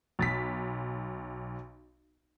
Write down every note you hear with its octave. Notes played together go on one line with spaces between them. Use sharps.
B1 A6 B6